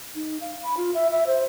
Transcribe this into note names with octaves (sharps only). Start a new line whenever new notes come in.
D#4
F5
B5
F4
E5
E5
C5